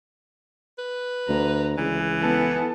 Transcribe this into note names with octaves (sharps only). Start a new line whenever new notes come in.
B4
D2 A#5
C#2 E3 G#4
B3 E4 A4